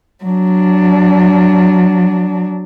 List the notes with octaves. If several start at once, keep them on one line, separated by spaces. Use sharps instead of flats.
F#3 D4